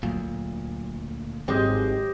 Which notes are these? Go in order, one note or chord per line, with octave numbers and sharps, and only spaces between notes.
D2 A#2 F#3
G#1 F#3 G#3 C4 G4 C5 D#5